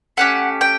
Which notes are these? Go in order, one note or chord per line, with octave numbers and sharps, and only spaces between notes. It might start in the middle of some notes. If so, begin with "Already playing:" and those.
A3 C#4 G4 F#5
G5